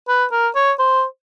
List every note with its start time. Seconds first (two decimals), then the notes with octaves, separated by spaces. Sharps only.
0.08 B4
0.32 A#4
0.55 C#5
0.79 C5